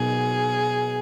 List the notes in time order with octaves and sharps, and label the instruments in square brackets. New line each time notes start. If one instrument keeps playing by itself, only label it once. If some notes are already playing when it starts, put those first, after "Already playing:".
Already playing: [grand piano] B2 F#3 B3 D#4 A#4 [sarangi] G#4